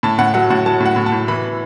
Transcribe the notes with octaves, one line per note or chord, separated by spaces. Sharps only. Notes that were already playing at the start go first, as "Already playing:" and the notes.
A2 A5
A2 F#5
F#3 F#5
A2 F#5
F#3 A5
A2
F#5
A2
A5
A2
E3 B5